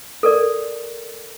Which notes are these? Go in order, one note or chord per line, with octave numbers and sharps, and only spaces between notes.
A4 A#4 D5